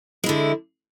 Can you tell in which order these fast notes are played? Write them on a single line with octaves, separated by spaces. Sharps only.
G#3 E4 D3